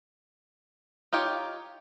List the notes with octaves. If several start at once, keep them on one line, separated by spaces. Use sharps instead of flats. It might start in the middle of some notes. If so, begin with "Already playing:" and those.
D#4 F4 G4 C#5